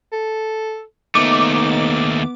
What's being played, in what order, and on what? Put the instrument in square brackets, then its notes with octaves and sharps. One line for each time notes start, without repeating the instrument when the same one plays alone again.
[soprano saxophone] A4
[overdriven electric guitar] D#2 A3 [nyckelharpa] B3 [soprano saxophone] D#4 [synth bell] D6